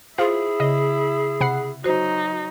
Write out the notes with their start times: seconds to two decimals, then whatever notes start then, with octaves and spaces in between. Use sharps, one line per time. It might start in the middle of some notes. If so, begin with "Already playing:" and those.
0.18 E4 F4 G#4 C5
0.60 C#3 D#5
1.41 C3 F#5 B5 C7
1.84 F#3 D#4 F#4 C5